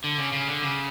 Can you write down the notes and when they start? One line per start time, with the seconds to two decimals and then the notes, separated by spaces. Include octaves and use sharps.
0.04 D3
0.18 C#3
0.33 C#3
0.48 D3
0.63 C#3